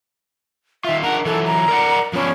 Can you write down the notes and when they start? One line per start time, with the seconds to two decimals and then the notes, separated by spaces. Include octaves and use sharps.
0.84 D#3 F4 E5
1.03 D4 A#4 F#5 A#5
1.26 E3 F#3 A4
1.46 A#5
1.68 A#4 D5 F#5
2.13 F3 B3 C#4 D4